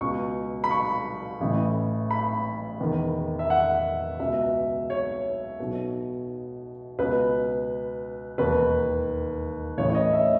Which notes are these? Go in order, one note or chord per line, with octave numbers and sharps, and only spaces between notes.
C#2 B2 C#6
B5
C#6
A1 A2 E3
B5
E1 E2 D#3
E5
F#5
C#2 B2 E5
C#5
B1 B2
C#2 B2 B4
E1 D#2 D#3 B4
A1 A2 E3 C#5
C#5
D#5
E5